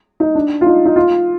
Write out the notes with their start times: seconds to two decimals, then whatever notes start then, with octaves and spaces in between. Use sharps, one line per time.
0.20 D#4
0.35 D4
0.61 F4
0.66 D#4
0.85 D#4
0.96 F4